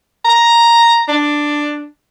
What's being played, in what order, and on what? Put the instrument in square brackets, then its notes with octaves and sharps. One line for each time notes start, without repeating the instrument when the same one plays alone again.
[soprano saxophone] A#5
D4